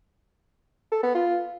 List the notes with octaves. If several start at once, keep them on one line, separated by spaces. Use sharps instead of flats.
A4
B3
F4